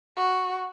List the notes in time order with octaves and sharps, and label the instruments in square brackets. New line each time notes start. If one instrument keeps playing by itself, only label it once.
[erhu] F#4